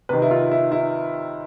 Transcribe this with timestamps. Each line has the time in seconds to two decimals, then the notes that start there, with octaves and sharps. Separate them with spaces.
0.09 C3 D#3 B4
0.22 E4
0.31 F4
0.52 E4
0.72 E4